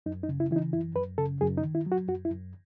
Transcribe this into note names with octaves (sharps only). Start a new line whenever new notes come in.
F#2 D#4
D#4
C#3
E4
E3 D#4 E4
F#2 E4
F#2 B4
C#3 A4
F#2 G#4
D#4
D#3
E4
F#3
F#4
F#2 F#4
E4
F#2